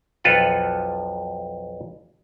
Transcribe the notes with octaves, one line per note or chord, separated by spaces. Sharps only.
B1 F2 F4 A4 B4 F#5